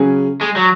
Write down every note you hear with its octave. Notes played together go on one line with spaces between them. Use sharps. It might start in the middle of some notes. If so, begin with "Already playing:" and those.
Already playing: C#3 F#3 C#4 G#4
G#3
F#3